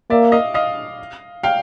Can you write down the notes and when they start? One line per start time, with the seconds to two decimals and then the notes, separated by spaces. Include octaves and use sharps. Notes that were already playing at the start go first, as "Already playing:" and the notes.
0.10 A#3 D5 E5
0.32 D#5 F5
0.54 D#5 F5
1.43 F5 G5